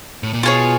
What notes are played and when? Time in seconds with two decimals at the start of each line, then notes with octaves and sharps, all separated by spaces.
0.23 A2
0.33 A#2
0.43 B2 F4 G#4 C#5